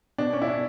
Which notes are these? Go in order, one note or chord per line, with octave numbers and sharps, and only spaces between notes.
B2 D4
C#4
E4
D4